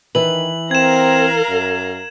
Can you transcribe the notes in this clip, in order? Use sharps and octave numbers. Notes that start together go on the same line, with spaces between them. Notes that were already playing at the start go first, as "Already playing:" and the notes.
D#3 E3 B4 F#7
C4 A#4 F5 A#5 G#6 E7
F#2